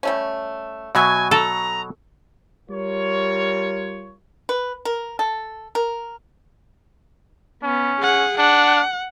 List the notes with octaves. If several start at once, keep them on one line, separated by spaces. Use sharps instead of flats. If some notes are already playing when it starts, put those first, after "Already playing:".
G3 A3 C#4
B2 F#3 E5 F#5 G#5
A4 A#5
G3 F4 A#4 C#5
B4
A#4
A4
A#4
B3 C#4
G#4 F#5
D4 F#5